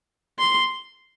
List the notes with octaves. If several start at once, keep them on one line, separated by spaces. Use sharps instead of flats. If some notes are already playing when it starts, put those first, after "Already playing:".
C6